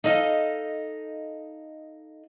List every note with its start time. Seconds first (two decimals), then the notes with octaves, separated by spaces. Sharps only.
0.04 D#4 A4 D#5 F5